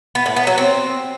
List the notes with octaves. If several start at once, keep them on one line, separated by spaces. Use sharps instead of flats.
B3
A2
B3
F#3
C4